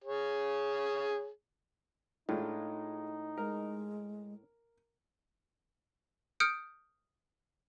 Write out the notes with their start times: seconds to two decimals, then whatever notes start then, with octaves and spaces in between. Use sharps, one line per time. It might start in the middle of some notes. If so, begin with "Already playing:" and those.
0.04 G#4 C#5
2.29 A2 G#3 D4 D#4 F4
3.38 G#3 A#4
6.40 D#6 F6 G6 C#7 D7